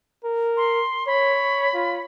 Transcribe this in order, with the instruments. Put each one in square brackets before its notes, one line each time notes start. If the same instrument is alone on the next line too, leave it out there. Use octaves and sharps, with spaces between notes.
[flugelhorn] A#4
[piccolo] C6
[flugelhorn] C#5 [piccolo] B5
[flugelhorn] F4